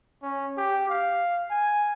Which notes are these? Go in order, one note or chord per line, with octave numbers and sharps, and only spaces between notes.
C#4
G4
F5
G#5